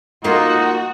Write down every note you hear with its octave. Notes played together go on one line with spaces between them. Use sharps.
A#3 D#4 F4 F#4